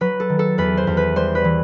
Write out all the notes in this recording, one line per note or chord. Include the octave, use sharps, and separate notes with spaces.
F#3 B4
A4
D#3
A4
E2 B4
C5
E2
B4
G3 C5
B4
E3